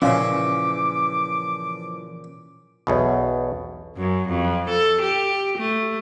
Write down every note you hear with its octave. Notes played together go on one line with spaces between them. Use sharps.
A#2 C#3 E3 F3 C#4 F5 D6
B1 E2 B2
F#2
F2
A4
G4
A3